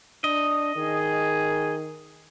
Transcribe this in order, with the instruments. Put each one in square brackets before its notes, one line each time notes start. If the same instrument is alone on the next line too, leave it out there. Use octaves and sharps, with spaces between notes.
[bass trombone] D4 [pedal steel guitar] D#5
[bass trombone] D#3 [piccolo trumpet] G#4